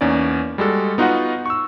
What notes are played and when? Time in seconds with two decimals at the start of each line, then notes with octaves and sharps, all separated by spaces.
0.01 E2 A#3 C#4 D#4 D5
0.58 G3 G#3 F#4 A4
0.98 B3 D#4 F4 F#4 D#5 F#5
1.46 C#6 E6